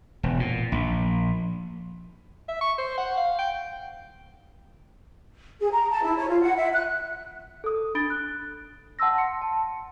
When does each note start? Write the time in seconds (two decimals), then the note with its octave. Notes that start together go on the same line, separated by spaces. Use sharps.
0.23 E1
0.40 A#2
0.72 A#1
2.48 E5
2.61 C#6
2.78 C5
2.98 F#5
3.17 F5
3.39 G5
5.61 G#4
5.72 A#5
5.91 A5
6.03 E4
6.17 C#5
6.28 F4
6.41 F#5
6.56 E5
6.73 F#6
7.64 A4 D#6
7.95 D4 B5 A6 D7 G7
8.10 F#6
8.99 F#5 A5 C6 E6 A#6
9.18 C6 C#7
9.42 A5